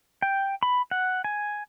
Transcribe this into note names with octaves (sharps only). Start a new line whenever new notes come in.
G5
B5
F#5
G#5